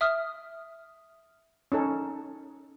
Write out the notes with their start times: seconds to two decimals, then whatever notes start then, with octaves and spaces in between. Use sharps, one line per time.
0.01 E5 D#6 F6
1.72 C#4 D#4 A4